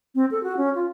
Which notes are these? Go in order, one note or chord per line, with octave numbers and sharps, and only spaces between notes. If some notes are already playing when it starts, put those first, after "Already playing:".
C4
A4
F#4
C#4
F4